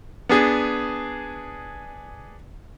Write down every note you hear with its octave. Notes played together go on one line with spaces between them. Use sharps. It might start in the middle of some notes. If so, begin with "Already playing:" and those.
B3 D4 G#4